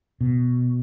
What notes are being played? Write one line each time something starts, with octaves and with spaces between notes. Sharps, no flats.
B2